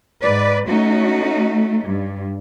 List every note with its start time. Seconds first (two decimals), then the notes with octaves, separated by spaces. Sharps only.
0.23 G#2 B4 D5
0.68 A3 C#4 D#4 F#4
1.85 G2